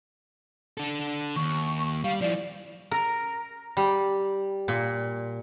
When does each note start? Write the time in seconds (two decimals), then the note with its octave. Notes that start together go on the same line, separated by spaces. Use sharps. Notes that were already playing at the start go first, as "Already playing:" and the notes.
0.78 D4 A4
1.36 D#2 C#6
2.04 G3 F5
2.21 F3 E4 D5
2.91 A#4
3.77 G3
4.68 A#2